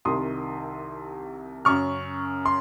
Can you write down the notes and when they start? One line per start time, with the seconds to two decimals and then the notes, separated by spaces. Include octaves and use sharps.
0.05 C2 C3 D#3 C6 D#6
1.65 F#2 C#3 C#6 F6
2.46 C6